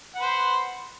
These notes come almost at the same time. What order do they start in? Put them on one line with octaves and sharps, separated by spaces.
F#5 B4 C5